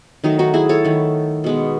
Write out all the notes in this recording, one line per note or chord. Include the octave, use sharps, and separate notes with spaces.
D#3 F#3 A3 D#4
D#4 F#4
E4 G#4
A4 C#5
D#3 A3
B2 G#3 B3